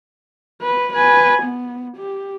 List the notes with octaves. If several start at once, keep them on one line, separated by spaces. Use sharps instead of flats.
B4
B4 G#5
B3
G4